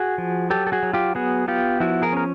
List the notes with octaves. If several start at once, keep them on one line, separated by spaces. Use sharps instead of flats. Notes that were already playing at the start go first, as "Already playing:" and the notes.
Already playing: F#4 G#4
F3
F#3 G4 A4
A4
F#4 G#4
F#3
F4 G4
B3 F#4 G#4
B3 F4 G4
F3 E4 F#4
G#4 A#4
C#4 A#4